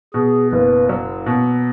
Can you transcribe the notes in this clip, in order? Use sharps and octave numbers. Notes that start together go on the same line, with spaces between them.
B2 G#4
F#1 B4
F#3
B2